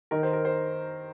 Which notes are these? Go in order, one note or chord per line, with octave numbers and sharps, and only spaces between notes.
D#3 A#4
C5
A#4
C5